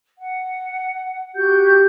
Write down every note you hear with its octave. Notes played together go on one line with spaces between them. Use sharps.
F#5
F#4 G4 G6